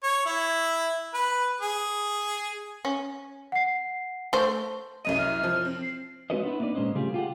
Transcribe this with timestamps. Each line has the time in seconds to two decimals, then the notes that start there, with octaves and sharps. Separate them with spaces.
0.03 C#5
0.26 E4
1.14 B4
1.61 G#4
2.85 C#4
3.52 F#5 C7
4.33 A3 C5
5.05 C2 F#2 D#5 D#7
5.18 F6
5.44 F3
5.65 C4
5.82 C7
6.30 G#3 C4 F#4 B4 C#5 D#5
6.43 B3 C4 D4 E4
6.60 A#3 D4 D#4 B4 D5
6.75 A#2 G#3 C#4 C5 D#5
6.95 C#3 G3 A3 F4 G4 G#4
7.14 F4 G4 G#4 F#5